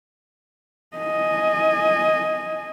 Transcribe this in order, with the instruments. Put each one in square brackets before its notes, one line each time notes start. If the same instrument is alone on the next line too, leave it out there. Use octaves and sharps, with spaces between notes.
[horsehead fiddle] D#5 G#5